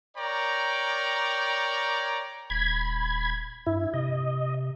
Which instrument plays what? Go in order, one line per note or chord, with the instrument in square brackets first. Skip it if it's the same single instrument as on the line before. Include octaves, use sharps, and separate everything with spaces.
[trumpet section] A#4 C#5 D5 G5 A#5
[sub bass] D#1 [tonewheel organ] B5 G#6
[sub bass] G2 [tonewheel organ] E4
[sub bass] C3 [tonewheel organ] D#5